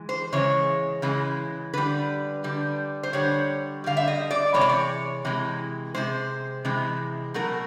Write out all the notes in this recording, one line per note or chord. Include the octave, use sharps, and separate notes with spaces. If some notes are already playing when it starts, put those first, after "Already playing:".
Already playing: E3 G#3
C5
C#3 E3 G#3 C#5
C#3 E3 G#3
D3 G3 B4
D3 G3
C5
D3 G3 C#5
D3 G3 F5
E5
D#5
D5
C3 E3 G#3 C#5
D5
C#5
C3 E3 G#3
C3 E3 G#3 C5
C3 E3 G#3
B2 F#3 A3 A#4